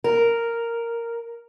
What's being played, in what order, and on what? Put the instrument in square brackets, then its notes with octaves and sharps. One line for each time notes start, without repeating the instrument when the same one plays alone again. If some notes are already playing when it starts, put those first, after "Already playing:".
[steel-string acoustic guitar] A#4